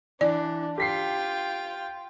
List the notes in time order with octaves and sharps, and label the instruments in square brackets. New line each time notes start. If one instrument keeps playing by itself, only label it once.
[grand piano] E3 [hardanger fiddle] D4 [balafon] D5
[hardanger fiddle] F4 G5 [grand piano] G4 B6 C7